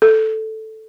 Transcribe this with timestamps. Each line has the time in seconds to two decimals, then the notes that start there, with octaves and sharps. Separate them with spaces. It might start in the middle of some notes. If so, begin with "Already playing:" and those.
0.02 A4